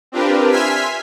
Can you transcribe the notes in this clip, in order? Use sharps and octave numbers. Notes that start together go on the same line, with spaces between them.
C4 D4 F4 G4 A#4 B4
E5 G#5 C6 F6 G#6 B6